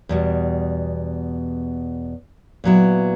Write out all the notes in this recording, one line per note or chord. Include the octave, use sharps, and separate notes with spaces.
E2 B2 G3
A#2 F#3 B3 E4